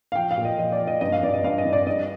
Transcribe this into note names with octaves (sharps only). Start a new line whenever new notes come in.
F5
F3 G5
F5
A#2
D#5
F3 D#5
D5
F3
D#5
G2 D#5
F5
G2 D5
D#5
G2 F5
D#5
G2
D5
G2 D#5